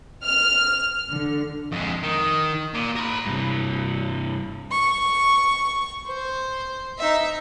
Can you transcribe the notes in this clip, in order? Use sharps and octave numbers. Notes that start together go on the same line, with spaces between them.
F6
D3
F2 G#3
D#3
A#2
A#4 B5
G2 C3
C#6
C5
D#4 E5